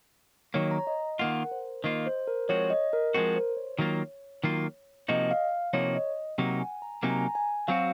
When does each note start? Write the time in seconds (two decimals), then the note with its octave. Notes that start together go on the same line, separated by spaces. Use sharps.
0.54 D#3 F#3 A#3 C#5
0.71 A#5
0.87 D#5
1.19 D#3 A#3 F4 F#5
1.45 A#4
1.51 C5
1.84 D#3 A#3 F4 D#5
2.07 C5
2.27 A#4
2.49 F3 G#3 C4 F#4 C#5
2.70 D#5
2.93 A#4
3.14 F3 G#3 C4 F#4 A#4
3.36 C5
3.57 C#5
3.79 D#3 F#3 A#3 F4
4.44 D#3 F#3 A#3 F4
5.08 C3 F3 A#3 D#4 F#4 D#5
5.31 F5
5.73 C3 F3 A#3 D#4 F#4 C#5
5.95 D#5
6.38 C3 F#3 A#3 D#4 F#5
6.60 G#5
6.82 A#5
7.03 C3 F#3 A#3 D#4 G#5
7.10 A#5
7.19 G#5
7.35 G#5
7.68 F#3 C4 F#4 F5